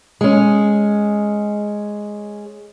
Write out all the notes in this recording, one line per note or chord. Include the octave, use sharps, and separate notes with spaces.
G#3 C#4